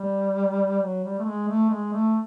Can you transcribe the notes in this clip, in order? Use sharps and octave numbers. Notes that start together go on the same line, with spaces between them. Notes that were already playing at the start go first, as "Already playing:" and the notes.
Already playing: G3
F#3
G3
A3
G#3
A3
G#3
A3